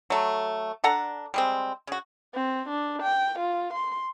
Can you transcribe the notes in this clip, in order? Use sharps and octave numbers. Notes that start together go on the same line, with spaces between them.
F#3 A3
D4 A4 F#5 A#5
G3 G#3 C4
C#3 F#4
C4
D4
G5
F4
C6